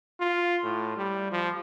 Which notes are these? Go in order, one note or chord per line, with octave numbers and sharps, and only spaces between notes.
F4
A2
G3
F3